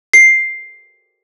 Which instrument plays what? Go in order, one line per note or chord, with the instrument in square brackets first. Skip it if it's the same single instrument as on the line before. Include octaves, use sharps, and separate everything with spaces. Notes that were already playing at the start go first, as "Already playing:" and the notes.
[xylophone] C7